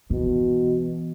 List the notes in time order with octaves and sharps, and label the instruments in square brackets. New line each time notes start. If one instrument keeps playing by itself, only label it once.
[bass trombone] B2 [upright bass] E3